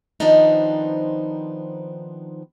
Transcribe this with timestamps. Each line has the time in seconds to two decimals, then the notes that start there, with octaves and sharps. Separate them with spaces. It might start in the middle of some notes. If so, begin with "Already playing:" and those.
0.20 D#3 F3 B3 C4 D4 D#4